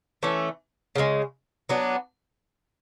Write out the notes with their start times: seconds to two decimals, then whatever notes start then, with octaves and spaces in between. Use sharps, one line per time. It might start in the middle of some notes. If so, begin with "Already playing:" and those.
0.23 E3 A3 C#4
0.95 C#3 E3 G#3
1.69 F#3 B3 D4